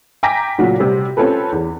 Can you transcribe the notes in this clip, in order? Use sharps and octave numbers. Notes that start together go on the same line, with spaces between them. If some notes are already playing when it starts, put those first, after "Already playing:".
G5 G#5 A#5 D6 A#6 B6
A#2 C#3 F#3 F4 F#4
C3 G3 C4
C4 C#4 F4 A4 B4
E2